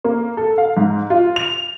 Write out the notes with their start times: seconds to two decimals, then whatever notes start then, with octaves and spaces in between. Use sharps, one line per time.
0.04 A#3
0.37 A4
0.58 F5
0.77 G#2
1.10 F4
1.36 F7